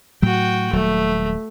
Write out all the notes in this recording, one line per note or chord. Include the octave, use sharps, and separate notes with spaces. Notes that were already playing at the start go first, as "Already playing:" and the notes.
A2 F#3 F#4 G5
D#1 F#3 G3 A3